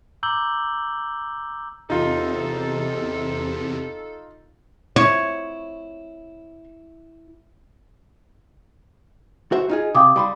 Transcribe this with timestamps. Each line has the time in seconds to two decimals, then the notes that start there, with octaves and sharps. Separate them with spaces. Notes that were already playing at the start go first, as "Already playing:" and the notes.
0.23 A#5 D6 E6 G6 F#7 G7
1.90 E2 C3 D#4 F4 A4
4.96 E4 C#5
9.52 F#4 C5 E5
9.70 D#4 F4 G#4
9.95 C3 F5 G5 D6 D#6
10.16 G3 B5 C6